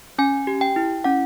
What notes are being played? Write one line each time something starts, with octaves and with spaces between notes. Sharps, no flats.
C#4 G#5
G4
G5
E4
C#4 F#5